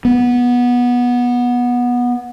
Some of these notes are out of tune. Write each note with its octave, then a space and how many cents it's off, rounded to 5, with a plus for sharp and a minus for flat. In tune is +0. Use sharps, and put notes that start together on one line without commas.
B3 -15